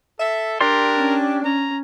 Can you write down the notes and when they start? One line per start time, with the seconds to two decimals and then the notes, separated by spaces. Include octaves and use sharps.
0.20 A4 E5
0.61 D4 G4 A#4 D5 C6
0.96 C#4
1.45 C#4 A#5